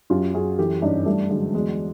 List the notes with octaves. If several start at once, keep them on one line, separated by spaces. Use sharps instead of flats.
F#2 F4 G4
F#2 F#4 G#4
E3 G4 A4
G2 C#4 D#4
G2 G3 A3
D3 F#3 G#3
E2 F#3 G#3